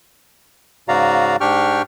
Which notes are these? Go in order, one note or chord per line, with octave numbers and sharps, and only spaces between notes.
G#2 C#3 F#4 D5 F5 A#5
G#2 D4 G4 G5 C#6 F6